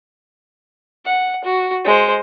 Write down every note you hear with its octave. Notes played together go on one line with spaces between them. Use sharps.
F#5
F#4
G#3 C5